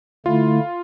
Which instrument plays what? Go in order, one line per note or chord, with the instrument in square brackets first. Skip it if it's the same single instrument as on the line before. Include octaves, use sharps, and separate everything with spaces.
[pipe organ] D3 A3 E4 [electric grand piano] F4